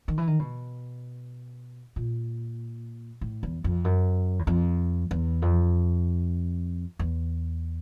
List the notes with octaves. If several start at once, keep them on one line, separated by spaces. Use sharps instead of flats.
D#3
E3
D#3
B2
A#2
A2
E2
F2
F#2
E2
F2
E2
F2
E2